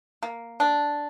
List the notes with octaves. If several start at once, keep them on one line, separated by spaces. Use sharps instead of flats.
A#3
D4